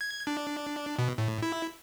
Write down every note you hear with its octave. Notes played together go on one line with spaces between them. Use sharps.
G#6
D4
B2
A2
E4